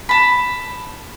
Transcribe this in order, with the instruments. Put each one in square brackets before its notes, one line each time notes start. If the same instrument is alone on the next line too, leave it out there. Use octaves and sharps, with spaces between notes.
[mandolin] A5 B5